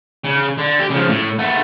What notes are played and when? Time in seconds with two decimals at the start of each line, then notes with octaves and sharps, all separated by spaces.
0.24 C#3
0.58 D3
0.79 G4
0.90 C#3 F3
1.10 A2
1.39 A3 B3